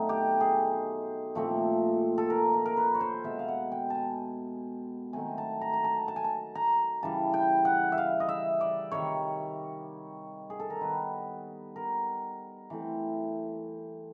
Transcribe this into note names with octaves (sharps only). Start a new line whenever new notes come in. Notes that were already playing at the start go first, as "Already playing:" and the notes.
Already playing: B2 F#3 A3 C4 D#4
G4
G#4
A#2 F3 A3 C4
A4
A#4
A#4
A#4
B4
C#5
C5
B2 G#3 B3 E5
F5
F#5
G5
G#5 A5
D#3 F#3 A3 C4 G#5
A5
A#5
A#5
A5
A5
G#5
A5
A#5
C#3 E3 G3 A5
G5
F#5
E5
F5
D#5
E5
D5
C3 D#3 G3 C#5
G#4
A4
A#4
D#3 G3 B3 B4
A#4
E3 A3 C4